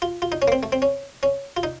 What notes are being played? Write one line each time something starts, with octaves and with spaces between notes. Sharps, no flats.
F4
F4
D#4
C#4
A#3
C4
A3
C4
C#4
C#4
F4
D#4